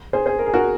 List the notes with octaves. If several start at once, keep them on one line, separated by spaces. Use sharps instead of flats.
G#4 C5
G#4 C5
A#4
G#4
F#4 A#4